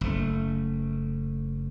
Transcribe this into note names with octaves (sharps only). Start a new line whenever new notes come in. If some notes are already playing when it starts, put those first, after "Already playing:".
F#1 A3